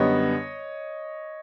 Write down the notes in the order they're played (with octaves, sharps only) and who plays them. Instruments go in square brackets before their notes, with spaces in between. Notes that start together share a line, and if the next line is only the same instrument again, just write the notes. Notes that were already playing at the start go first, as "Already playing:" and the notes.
Already playing: [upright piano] F#2 D3 G3 B3 C#5 D#5